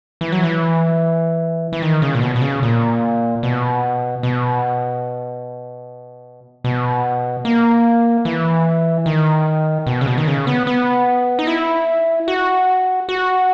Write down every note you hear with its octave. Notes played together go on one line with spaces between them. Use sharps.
E3
F#3
E3
E3
D#3
C#3
A#2
B2
B2
C#3
A#2
B2
B2
B2
A#3
E3
D#3
B2
C#3
B2
D#3
C#3
B3
B3
D#4
E4
F#4
F#4